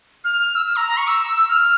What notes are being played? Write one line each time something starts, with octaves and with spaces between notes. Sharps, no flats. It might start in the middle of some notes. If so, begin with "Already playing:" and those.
F6
E6
E6
A#5
A#5
C#6
E6
F6